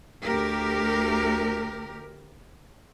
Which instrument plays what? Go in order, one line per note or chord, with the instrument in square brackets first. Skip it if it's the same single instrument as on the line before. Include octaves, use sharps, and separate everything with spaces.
[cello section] D2 G4 A#4